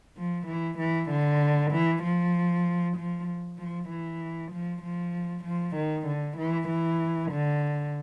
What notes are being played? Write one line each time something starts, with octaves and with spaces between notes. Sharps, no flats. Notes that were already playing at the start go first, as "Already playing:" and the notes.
F3
E3
E3
D3
E3
F3
F3
F3
E3
F3
F3
F3
D#3
D3
E3
E3
D3